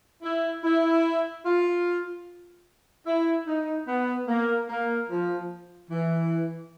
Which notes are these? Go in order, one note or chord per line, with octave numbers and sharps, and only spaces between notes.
E4
E4
F4
E4
D#4
B3
A#3
A#3
F3
E3